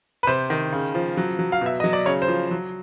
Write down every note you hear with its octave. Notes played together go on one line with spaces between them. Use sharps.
B4
C3 C5
D#3
C#3
F3
F#3
F#3
F5
B2 E5
F#3 D#5
D5
C#3 C#5
C5
F3
F#3